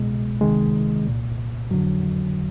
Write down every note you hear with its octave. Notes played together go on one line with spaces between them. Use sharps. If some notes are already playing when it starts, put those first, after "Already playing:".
Already playing: C2 B2 G#3
C#2 C3 D#3 G#3
C2 A#2
F2 D3 F#3